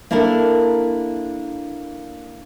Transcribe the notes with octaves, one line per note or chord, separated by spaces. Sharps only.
A#3 D4 E4 A4 A#4